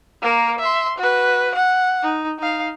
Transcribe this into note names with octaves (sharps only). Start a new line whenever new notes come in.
A#3 A#4
E5 C6
F#4 B4
F#5
D#4
D#4 F5